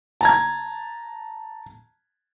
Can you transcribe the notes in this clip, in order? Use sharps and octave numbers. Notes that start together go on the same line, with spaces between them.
A5 A#5 G#6